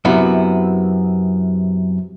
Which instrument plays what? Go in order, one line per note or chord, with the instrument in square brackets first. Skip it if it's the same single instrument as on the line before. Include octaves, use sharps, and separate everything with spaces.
[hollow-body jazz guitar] F#2 C3 B3 E4